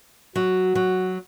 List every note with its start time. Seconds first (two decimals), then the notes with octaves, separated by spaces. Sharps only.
0.36 F#3 F#4
0.75 F#3